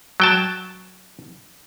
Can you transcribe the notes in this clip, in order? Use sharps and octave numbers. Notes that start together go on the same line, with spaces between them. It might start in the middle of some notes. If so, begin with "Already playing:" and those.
F#3 G5 A5